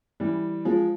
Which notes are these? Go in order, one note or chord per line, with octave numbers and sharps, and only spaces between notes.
E3 G3
F3 G#3